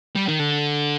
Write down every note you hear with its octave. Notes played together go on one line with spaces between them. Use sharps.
G3
D#3
D3